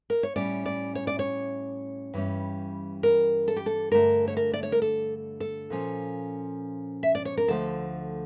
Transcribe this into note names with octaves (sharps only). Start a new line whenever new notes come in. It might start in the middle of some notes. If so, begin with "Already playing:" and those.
A#4
C#5
A2 G3 C#4 D5
D5
C#5
D5
C#5
G2 E3 G3 C#4
A#4
A4
G4
A4
G2 D3 A3 A#4
C#5
A#4
D5
C#5
A#4
A4
A4
A#2 F3 C#4
E5
D5
C#5
A#4
D2 D3 F3 A3 A4